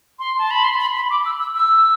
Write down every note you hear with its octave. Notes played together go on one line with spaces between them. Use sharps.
C6
A5
B5
C6
B5
B5
D6
E6
E6
E6